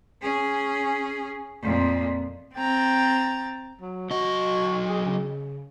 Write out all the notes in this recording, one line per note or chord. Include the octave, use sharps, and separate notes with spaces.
C#4 G#4
F2 A#2
C4 G5 A#5 A6
F#3
F#3 F#4 D#5
G#4
C#3